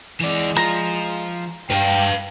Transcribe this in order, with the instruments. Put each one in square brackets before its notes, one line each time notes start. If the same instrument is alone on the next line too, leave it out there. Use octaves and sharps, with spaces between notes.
[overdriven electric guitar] E3 D5 [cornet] G#3
[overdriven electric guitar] F3 [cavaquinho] A#5
[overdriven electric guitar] G2 [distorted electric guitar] B4 F5 [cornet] G5